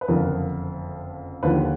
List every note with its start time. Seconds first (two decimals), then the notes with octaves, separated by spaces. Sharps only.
0.01 B4
0.08 F#1 F2 D3 F3 A#4
1.43 D#2 D3 F3 B4